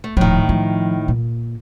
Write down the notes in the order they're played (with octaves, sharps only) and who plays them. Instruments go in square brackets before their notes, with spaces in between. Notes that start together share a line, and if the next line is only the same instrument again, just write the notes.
[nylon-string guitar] A3
[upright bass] D#1 F3 [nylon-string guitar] A2 D#3
[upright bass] F3
A#2